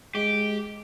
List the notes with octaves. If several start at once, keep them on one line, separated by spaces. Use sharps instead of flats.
G#3 G4